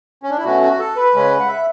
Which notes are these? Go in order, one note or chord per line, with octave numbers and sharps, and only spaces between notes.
C#4
D4
E4
B2 F#3 A3 C#4 F#4
F#4
A4
B4
C#3 G#3 C#4
F#5
E5